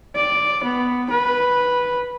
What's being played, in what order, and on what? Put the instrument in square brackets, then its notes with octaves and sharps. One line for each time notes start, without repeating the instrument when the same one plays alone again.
[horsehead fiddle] D5
B3
B4